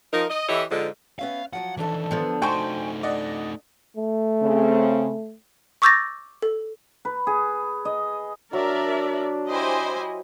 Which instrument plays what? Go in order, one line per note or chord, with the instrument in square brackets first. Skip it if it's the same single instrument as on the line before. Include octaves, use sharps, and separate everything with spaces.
[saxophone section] F3 D#4 A#4
D#5
E3 E4 G4 A4 C#5 D#5
G#2 D3 F3
[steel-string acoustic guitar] B3 C#4 E5 [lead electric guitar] F5
[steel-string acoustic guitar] F3 F#3 F4 [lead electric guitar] F#5
[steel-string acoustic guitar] F2 D4 A4 [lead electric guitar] D#3 E3
[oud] D3 F3 B3
[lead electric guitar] A3 D#4 [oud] F#4 C5 [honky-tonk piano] G5 G#5 C#6
[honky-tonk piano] D5 D#5 F#5
[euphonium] A3
[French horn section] C#3 C4
[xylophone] C#6 D6 E6 G6 A6 A#6
A4
[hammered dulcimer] B4
G#4
D#5
[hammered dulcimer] F#3 [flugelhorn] D4 [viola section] A#4 D5 E5
[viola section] E4 D#5 [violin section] G4 C5 G#5